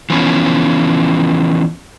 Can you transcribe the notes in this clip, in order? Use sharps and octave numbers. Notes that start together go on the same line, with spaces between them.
E3 F3 B3 C#4